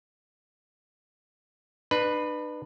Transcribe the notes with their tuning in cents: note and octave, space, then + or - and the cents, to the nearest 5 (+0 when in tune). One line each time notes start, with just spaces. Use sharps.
D4 +45 B4 +0